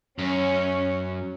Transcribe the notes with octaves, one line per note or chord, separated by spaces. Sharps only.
F#2 C#4